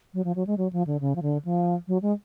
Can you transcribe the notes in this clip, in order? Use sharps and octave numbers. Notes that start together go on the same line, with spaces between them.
F#3
F3
F#3
G#3
F#3
F3
D3
C#3
F3
D3
F3
F#3
G#3